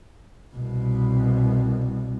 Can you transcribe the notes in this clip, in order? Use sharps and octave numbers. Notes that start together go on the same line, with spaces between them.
C2 B2